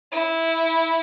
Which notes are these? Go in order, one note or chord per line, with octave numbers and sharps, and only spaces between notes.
E4